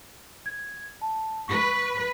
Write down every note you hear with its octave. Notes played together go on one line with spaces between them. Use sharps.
G#6
A5
B4 C#6